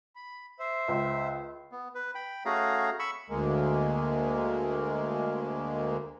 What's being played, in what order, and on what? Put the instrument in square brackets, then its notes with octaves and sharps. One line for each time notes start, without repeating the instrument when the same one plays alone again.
[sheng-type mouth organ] B5
C5 E5
[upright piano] C#2
[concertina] B3
B4
G5 B5
A3 C#4 F#4 G#4 F5 A#5
B5 C#6 E6
[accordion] D2 G#3 A#3